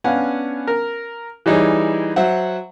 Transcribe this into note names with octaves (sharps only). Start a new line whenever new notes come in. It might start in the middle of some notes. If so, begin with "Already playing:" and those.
B3 C#4 D4 F5 F#5 G#5
A#4
E3 G3 D#4 E4 G#4 C#5
F#3 C5 E5 F#5